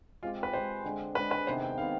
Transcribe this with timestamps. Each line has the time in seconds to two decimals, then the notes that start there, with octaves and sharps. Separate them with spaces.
0.23 G#3 C4 F4 G4
0.43 B4
0.53 G#3 C4 G4 C5
0.84 D3 G#3 D4
1.15 D3 G#3 D4 B4
1.31 B4
1.47 C3 D#3 B3 C5
1.62 G5
1.77 C3 D#3 B3 F5